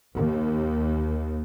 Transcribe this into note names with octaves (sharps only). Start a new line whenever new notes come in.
D#2